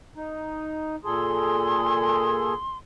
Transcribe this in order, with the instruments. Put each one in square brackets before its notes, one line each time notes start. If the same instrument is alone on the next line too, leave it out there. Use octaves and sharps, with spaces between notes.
[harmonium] D#4
[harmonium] A#2 G#4 A4 [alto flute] C6